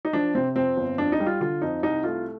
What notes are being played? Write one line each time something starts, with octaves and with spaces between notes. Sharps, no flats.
D#4
F3 D4
C3 C4
F2 C4
G1
F2 D4
D#4
G3
F4
D3 F4
F2 D#4
C2 D#4
A3 F4